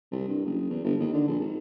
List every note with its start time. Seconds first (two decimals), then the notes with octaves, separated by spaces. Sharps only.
0.12 C2
0.28 G2
0.45 F#1
0.70 E2
0.84 G1
1.00 D#2
1.13 D3
1.28 A#1
1.40 G#1